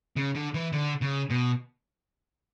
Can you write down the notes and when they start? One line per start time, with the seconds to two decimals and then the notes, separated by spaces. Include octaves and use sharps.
0.16 C#3
0.35 D3
0.54 E3
0.73 D3
1.01 C#3
1.30 B2